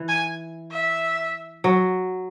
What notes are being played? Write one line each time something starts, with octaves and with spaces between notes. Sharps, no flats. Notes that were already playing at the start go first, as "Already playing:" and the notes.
Already playing: E3
G#5
E5
F#3